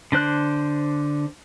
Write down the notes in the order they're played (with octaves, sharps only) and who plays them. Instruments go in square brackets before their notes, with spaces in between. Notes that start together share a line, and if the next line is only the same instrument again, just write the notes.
[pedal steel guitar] D3 D4 C5 F#6